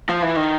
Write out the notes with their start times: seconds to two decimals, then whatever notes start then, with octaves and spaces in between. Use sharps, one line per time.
0.09 F3
0.22 E3
0.36 D#3